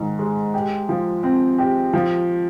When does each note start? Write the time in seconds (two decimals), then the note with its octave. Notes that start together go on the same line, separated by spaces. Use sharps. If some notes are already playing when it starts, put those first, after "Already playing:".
Already playing: G#2 D#3
0.19 G#3
0.54 G4
0.89 F3
1.23 C4
1.58 G4
1.93 F3